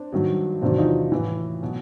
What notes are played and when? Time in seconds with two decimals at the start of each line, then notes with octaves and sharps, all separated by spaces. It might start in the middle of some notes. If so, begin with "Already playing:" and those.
Already playing: C4 D4
0.13 G2 D#3 F#3
0.62 E2 C3 D#3 F#3 C4 D4
0.78 D#4 F4
1.12 A2 E3
1.63 B2 F#3